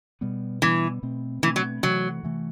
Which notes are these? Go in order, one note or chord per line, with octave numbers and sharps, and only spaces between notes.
B2 G3 B3
B2 E3 G3 B3
B2 A3 C4
B2 E3 A3 C4
F#3
C3 E3 F#3 A3
C3 E3 A3